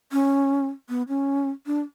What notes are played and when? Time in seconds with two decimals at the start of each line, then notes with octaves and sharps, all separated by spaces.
0.12 C#4
0.89 B3
1.08 C#4
1.66 D4